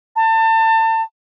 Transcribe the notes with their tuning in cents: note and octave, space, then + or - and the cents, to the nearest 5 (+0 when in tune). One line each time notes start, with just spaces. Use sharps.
A5 +30